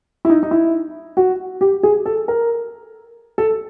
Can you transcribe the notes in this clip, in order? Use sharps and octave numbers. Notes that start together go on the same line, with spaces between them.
E4
D#4
D#4
E4
F#4
G4
G#4
A4
A#4
A4